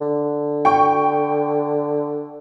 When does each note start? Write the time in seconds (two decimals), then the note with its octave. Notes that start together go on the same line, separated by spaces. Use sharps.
0.01 D3
0.65 G5 C#6